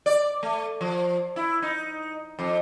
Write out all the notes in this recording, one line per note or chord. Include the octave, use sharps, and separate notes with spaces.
D5
A3
F3
E4
D#4
F2